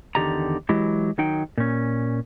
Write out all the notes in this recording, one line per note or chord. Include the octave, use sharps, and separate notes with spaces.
E2 D3 D#3 G4 D5 A#5
E3 F#3 G#3 E4 G4
D#3 F#3 D#4 G5
A#2 C#4